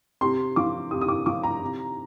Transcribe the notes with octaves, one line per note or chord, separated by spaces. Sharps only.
C3 C6
F3 D6
C3 D#6
D#6
D6
F3 D6
A#5
C3